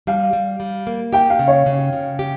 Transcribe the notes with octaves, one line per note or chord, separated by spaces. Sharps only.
G3 F5
G3
G3
A#3
G4 G5
F5
C#3
C#5
C#3
C#3
G4